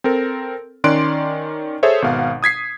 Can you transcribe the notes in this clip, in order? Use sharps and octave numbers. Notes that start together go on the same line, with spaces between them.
C4 A4 A#4
D#3 C#4 D5 C6 F#6 D7
G#4 A4 C5 C#5 E5
G#1 B2 F5 F#5
D#6 G#6 B6 C7